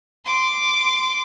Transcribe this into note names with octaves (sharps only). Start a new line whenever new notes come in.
C6 D6